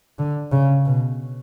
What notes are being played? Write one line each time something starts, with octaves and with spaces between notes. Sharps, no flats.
D3
C#3
B2